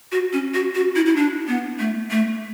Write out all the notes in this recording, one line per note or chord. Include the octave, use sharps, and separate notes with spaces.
F#4
C#4
F#4
F#4
E4
E4
D4
B3
A3
A3